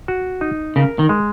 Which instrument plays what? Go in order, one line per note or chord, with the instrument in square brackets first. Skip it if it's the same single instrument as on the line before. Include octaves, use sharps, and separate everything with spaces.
[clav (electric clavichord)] F#4
D#4
[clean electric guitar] C#3 [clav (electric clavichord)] A#4
[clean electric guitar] D#3
[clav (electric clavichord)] G#3